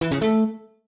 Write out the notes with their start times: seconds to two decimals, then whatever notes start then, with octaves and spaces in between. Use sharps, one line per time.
0.01 E3
0.11 C#3
0.22 A3